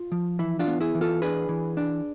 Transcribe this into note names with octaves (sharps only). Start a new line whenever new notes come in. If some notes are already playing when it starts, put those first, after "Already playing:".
Already playing: F4
F3
E3 E4
D4 F4
B3
E4 G#4
E3
F4 A4
D4 G#4 B4
E3
D4